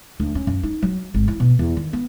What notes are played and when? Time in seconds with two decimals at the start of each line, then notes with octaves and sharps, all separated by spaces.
0.20 D2
0.35 C#4
0.47 F#2
0.63 D#4
0.82 F#3
1.14 G#1
1.28 E3
1.40 B2
1.59 E2
1.77 D#3
1.93 B3